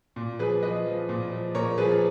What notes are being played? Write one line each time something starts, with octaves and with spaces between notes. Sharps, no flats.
A#2
F3 G#4 B4
F3 B4 D#5
F3
A#2
F3
A#2 A#4 C#5
F3 G#4 B4
G#4